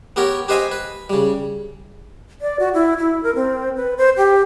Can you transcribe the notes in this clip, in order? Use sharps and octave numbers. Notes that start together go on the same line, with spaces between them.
B3 G4 A#4 C#5
G4 B4 C5 D#5 F5 G#5
B4
C#3 G3
D5
F#4
E4
E4
A#4
C4
B4
C5
G4